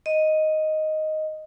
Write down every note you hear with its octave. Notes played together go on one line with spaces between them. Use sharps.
D#5